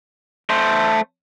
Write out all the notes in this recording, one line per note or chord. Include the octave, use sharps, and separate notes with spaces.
A3 C5